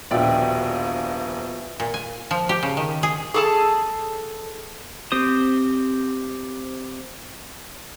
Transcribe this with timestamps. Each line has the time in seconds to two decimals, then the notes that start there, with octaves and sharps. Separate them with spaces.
0.11 D#1 A#1 B2 F4 D5 E5 G5
1.80 A#2
1.94 G#5
2.31 F3
2.49 G4
2.63 C#3
2.77 D#3
3.03 G#4
3.34 G#4 A4 A5
5.12 C4 G4 C5 D#6